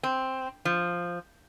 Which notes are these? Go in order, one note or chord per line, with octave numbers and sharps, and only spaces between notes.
C4
F3